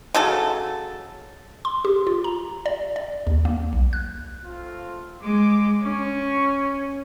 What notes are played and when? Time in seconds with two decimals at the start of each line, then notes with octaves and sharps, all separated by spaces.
0.15 C#3 F#3 A4
1.65 C6
1.85 G4
2.07 F4
2.24 A#5
2.66 D5
2.96 D5
3.27 D#2
3.45 A#3
3.73 B1
3.93 F#6
4.43 A3 C4 F4
5.22 G#3 D6
5.83 C#4 C#6